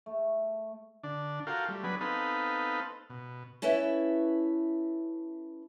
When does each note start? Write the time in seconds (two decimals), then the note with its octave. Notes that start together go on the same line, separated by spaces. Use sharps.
0.06 A3
1.03 D3 D4
1.47 F4 F#4 A4 A#4 F5 G5
1.68 G3 A3
1.84 F#3 B3 D4 G#4 B4
2.01 B3 C4 D#4 A4 B4 F5
3.10 B2
3.62 C#4 E4 A4 B4 E5